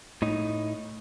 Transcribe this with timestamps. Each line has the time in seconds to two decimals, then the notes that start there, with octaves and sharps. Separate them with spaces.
0.22 A2 D#4